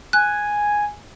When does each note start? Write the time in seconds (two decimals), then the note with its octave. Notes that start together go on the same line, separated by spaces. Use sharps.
0.13 G#5 F#6